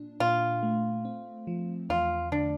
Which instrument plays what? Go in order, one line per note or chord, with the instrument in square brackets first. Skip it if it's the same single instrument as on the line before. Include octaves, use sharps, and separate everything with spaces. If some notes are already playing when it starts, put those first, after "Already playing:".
Already playing: [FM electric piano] A#2 D4
[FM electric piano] A#2 [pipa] F4
[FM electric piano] A3
C4
F3
[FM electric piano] E2 [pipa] F4
[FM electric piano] D3 [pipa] D4